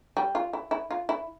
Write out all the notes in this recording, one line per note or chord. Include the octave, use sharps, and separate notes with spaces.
G3
F4
E4
E4
F4
E4